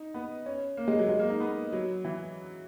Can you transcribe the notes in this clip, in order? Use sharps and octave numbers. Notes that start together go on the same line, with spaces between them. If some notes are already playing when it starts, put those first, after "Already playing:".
Already playing: D#4
B3
C#4
A#3
G#3
F#3
G#3
A#3
D#4
B3
F#3
E3